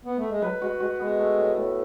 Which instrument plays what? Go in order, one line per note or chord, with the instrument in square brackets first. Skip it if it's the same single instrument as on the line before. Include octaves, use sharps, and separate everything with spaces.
[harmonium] B3
A3
G#3
[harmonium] F#3 [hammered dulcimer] B4
[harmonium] G#3 [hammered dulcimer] F#4
[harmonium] G#3 [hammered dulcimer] F#4
[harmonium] G#3 [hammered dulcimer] B3
[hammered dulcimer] A3
A2
A2